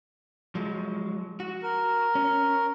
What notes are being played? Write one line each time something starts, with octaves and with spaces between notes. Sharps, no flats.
F3 F#3 G#3
F#4
A#4
C#4